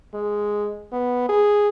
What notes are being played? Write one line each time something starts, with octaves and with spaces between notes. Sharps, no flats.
G#3
B3
G#4